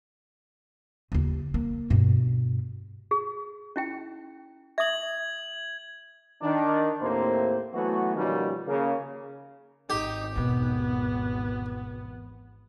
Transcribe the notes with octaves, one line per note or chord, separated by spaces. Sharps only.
D#2 C#3
A#3
G2 B2
G#4
C#4 E4 G5
E5 D#6 G#6 F#7
D#3 D4
D#2 A2 A#3 C4 C5
E3 F#3 A3 B3 F#4
B2 D#3 F3 G3 A#3 C#4
C#3 A#3
G#1 D#4 G4
E2 B2 B3